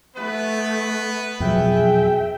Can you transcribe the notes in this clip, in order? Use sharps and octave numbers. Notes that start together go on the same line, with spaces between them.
A3 B3 B4
F2 B2 F#3 G#4 E5 G5